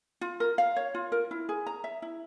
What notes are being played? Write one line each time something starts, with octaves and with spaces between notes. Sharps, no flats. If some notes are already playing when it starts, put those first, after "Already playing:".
F4
A#4
F5
C#5
F4
A#4
E4
G#4
A#5
E5
E4